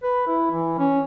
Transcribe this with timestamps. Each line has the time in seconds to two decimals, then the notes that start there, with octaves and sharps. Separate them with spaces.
0.03 B4
0.27 E4
0.51 E3
0.79 C#4